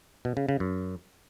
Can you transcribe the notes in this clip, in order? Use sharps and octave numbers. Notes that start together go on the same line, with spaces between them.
B2
C#3
C#3
F#2